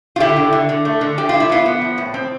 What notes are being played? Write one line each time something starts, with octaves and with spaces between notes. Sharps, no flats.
F4
D3 E4 G4
D3
D3
D3
A3
D3
F3 G4
E4 F4
E4
B3 F4
B3
F3
A2
C4